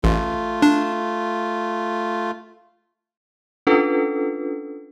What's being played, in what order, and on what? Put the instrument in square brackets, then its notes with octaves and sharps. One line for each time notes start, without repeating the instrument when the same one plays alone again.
[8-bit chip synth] A1 [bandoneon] A3 F4
[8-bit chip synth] D4
[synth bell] C#4 D4 F4 A4 B4